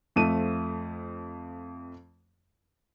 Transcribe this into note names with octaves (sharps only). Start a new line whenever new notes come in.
F2 F3 A3 D#7